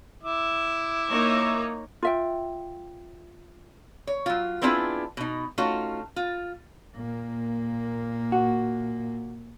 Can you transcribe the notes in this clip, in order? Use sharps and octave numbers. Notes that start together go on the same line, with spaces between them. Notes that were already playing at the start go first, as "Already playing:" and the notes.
E4 E5 D6
A#3 D#4 C#5
F4 E5 G5
C#5
F#3 F4
B3 C4 D4 E4 F4 G#4
B2 D#4
A3 C#4 D#4 F4 F#4
F4
A#2 A#3
F#4